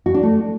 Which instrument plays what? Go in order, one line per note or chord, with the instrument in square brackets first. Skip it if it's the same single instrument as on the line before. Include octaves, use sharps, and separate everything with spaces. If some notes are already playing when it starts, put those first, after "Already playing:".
[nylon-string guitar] F#4
D4
A3